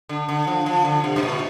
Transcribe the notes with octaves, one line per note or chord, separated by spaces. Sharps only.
D3
D3
F3
F3
D3
C3
G2
A#2